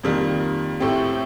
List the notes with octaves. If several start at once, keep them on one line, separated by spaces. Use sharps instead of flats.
F2 D#3 G3 A#3
A2 A3 C4 G4